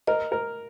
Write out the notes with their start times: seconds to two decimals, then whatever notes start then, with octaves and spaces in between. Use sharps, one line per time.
0.07 A#4 D#5
0.32 A#4